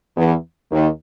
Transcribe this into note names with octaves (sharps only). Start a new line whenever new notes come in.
E2 E3
D#2 D#3